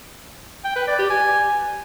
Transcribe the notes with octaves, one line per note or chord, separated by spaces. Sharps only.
G5
B4
D5
G4
G#5